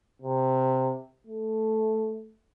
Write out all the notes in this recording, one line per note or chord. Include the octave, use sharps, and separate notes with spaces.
C3
A3